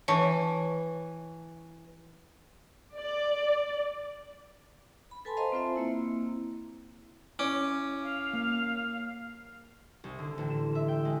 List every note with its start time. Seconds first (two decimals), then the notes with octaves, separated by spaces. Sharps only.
0.08 E3 C#5 A5 C#6
2.98 D5
5.11 B5
5.25 A4 B4 G#5 A5 B5 C6
5.37 C5 D#5 F5 A#5 C6
5.52 C4 F4 C5 E5
5.76 A#3 C4 E4
7.39 C#4 E4 D6
8.03 F5
8.34 A#3
10.04 C2
10.19 D3
10.38 A1
10.50 E7
10.75 E5
10.88 G5
11.05 G#3